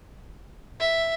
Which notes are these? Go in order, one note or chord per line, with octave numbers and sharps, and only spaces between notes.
E5